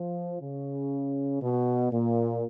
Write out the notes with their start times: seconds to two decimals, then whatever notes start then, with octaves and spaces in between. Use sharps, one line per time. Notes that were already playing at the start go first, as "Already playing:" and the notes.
Already playing: F3
0.42 C#3
1.42 B2
1.92 A#2